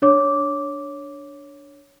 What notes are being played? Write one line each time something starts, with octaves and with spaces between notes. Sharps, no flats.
D4 C#5 D6